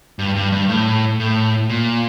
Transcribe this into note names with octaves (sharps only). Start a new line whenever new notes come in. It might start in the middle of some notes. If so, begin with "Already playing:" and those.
G2
G2
G2
A2
A2
A#2